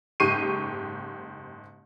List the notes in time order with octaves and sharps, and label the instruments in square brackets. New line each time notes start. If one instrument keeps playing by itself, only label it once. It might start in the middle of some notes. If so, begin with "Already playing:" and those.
[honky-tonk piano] F#1 G#2 G4 C#6 C7 D#7